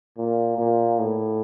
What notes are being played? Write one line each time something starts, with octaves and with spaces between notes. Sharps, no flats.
A#2
A#2
A2